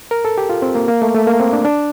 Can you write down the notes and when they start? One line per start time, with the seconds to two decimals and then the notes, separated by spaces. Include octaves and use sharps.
0.11 A#4
0.25 A4
0.38 G4
0.49 F4
0.62 C4
0.75 A#3
0.88 A#3
1.02 A3
1.15 A3
1.27 A#3
1.40 C4
1.53 D4
1.65 D4